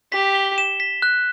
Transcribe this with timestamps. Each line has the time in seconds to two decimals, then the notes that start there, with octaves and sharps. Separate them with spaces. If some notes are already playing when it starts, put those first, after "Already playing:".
0.12 G4 B6
0.35 G7
0.58 E7
0.80 B6
1.02 F#6